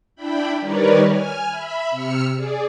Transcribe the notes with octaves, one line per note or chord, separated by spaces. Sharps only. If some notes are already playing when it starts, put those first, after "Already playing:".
D4 E4 G5 B5
D#3 G3 A#4 B4 C#5 D5
G#5 F6
E5 B5
C3 E6 F6 C#7
G#4 D5